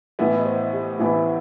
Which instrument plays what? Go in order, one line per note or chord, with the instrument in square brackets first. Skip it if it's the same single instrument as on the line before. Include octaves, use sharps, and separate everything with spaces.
[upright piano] A1 A2 E3 B3 [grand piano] E4
[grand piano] D#5
C5
G4
[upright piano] A1 A2 E3 B3 [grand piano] E4